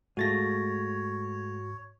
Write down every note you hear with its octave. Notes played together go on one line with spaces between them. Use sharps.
G#2 G#3 A3 F4 F#4 C#5 A6 A#6